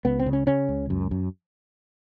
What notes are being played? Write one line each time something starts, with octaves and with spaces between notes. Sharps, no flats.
C#2 B3
C4
C#3
C#4
C#3 C#4
C#2
F#2
F#2